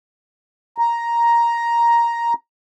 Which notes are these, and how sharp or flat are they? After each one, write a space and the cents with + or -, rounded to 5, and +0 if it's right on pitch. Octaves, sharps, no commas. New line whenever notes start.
A#5 +5